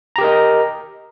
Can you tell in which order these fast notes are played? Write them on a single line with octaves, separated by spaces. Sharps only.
A#5 G4 A#4 D#5